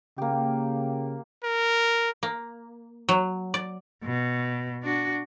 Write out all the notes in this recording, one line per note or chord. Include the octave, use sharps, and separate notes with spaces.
C#3 A#3 G4
A#4
A#3
F#3
D5
B2
D4 F#4